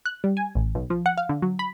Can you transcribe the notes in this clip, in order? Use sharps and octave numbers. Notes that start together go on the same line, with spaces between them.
F#6
G3
G#5
A1
B1
F3
F#5
F5
D3
F#3
B5